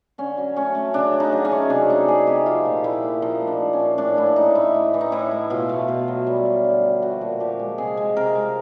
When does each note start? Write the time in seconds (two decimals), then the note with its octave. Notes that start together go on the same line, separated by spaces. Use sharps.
0.18 D3 C#4
0.37 F#3
0.56 A3 C#4
0.75 A3
0.94 C#3 D4
1.13 A3
1.20 D#4
1.32 F#3
1.45 C#4
1.52 A3
1.70 C3 D4
1.89 A3 D#4
2.08 A3 G#4
2.27 C3 G4
2.46 F3 F4
2.65 A#2
2.84 A#2 E4
3.03 A#2
3.22 F3 D#4
3.41 A3
3.47 D4
3.60 F3
3.73 C#4
3.79 A#2
3.98 A2 D4
4.17 A2 E4
4.36 A2 D#4
4.55 A3 E4
4.74 A2
4.94 E3
5.01 D#4
5.12 A2 E4
5.31 A3
5.50 B2 F4
5.69 A3
5.88 B2
6.08 F#3
6.27 G3
6.46 G3
6.64 D3
6.84 D3
7.02 F3 F#4
7.21 A#2
7.40 F3 G4
7.59 G#3
7.78 C3 G#4
7.97 G#3
8.17 C3 A#4
8.35 G#3